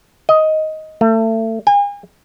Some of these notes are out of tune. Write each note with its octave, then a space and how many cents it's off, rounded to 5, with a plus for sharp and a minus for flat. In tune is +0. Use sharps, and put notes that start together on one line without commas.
D#5 +10
A3 +30
G#5 -40